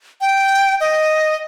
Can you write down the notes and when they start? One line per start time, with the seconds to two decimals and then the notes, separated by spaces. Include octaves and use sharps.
0.21 G5
0.81 D#5